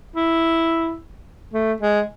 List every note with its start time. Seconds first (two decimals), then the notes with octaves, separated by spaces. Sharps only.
0.16 E4
1.54 A3
1.81 G#3